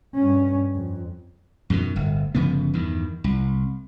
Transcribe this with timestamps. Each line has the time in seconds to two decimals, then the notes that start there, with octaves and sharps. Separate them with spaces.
0.15 G2 C#4
0.75 F2
1.70 F#2 B2 D3 D#3
1.96 D1 G1
2.35 G1 C#3 F3 B3
2.74 E2 G2 D#3
3.24 C2